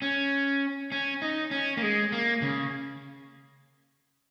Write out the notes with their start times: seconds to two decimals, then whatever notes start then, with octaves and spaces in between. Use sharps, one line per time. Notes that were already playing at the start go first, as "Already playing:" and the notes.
0.02 C#4
0.92 C#4
1.22 D#4
1.51 C#4
1.77 A#3
1.82 G#3
2.12 A#3
2.42 C#3